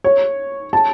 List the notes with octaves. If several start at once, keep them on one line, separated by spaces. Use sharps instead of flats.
C#5
A5